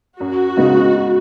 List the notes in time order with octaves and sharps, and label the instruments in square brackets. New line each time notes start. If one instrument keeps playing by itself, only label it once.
[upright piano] F#2 [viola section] F#4
[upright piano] C#3 G#3 B3 D#4